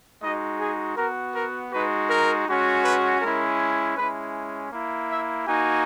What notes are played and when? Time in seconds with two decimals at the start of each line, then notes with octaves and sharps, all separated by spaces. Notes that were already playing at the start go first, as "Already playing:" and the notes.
0.23 G#3 D#4 F#4 D#5
0.60 G#4
0.97 B3 F#4 A#4
1.35 A#4
1.72 G#3 D#4 F#4 B4
2.10 A#4
2.47 G#3 C#4 F#4
2.85 B4
3.22 G#3 C#4 E4 A#4
3.97 G#3 C#4 E4 B4
4.72 A#3 E4
5.10 E5
5.47 A#3 D#4 F#4 G#5